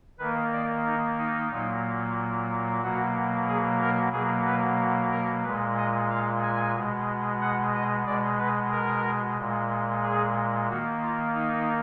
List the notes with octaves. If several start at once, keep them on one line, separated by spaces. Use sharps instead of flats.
D#3 A#3 B4
D5
D#4
D#4
A#2 F#3 A#3
B2 F#3 A#3 F#4
G#4
A#4
B2 F#3 A#3 G#4
B4
A#4
A#2 G#3 B4
D#5
F5
G#5
B2 G#3
F#5
D#5
B2 G#3 D5
B4
A#4
A#2 G#3
G#4
D#3 A#3 F#4
F4
D#4